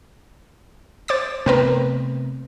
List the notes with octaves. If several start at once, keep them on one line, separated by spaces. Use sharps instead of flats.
C5 D6 A6
C3 A3 B3 C4 A#4 B4